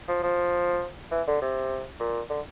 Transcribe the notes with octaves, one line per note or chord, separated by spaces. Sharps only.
F3
F3
E3
D3
C3
A#2
D3